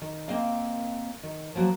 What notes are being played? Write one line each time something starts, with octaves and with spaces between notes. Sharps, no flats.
D#3
A#3 C4 A#4 D#5 F5
D#3
F3 F#3 A#3 F#4